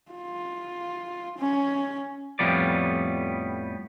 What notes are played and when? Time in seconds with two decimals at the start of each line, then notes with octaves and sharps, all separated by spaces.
0.12 F4
1.38 C#4
2.39 F2 A2 F3 G3 B3 D5